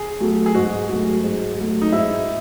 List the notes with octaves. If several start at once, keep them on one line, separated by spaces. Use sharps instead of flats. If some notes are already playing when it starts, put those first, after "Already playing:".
Already playing: G#4
F#3 A3
G#4
G#2 F#4
F#3 A3
G#2
F#3 A3
D#4
G#2 E4